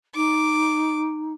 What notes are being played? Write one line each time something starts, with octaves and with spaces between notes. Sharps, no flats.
D#4 D6